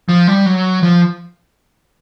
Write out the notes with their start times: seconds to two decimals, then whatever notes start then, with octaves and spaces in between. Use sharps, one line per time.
0.09 F3
0.27 G3
0.46 F#3
0.83 F3